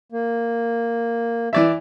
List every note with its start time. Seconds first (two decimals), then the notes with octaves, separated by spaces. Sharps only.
0.12 A#3
1.53 E3 D5 E5